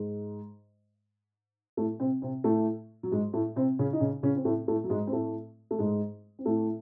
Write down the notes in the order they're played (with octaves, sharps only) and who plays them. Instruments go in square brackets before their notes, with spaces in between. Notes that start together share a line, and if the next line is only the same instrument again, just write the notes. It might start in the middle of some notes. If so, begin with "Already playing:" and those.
Already playing: [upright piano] G#2 G#3
A2 A3
C3 C4
C3 C4
A2 A3
F#3
G#2 G#3
A2 A3
C3 C4
C#3 C#4
D#4
C#3 C#4
C#3 C#4
C4
A2 A3
A2 A3
F#3
G#2 G#3
C4
A2 A3
A3
G#2 G#3
C4
A2 A3